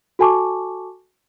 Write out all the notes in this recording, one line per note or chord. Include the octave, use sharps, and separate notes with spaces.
F#4 A4 G#5 A5 C#6 D6